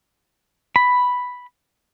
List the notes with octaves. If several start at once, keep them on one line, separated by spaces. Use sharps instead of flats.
B5